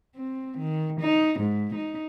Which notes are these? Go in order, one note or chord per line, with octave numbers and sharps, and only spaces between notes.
C4
D#3
D#4
G#2
D#4